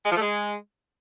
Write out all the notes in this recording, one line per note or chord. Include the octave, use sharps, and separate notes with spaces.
G#3
F3
A3
G#3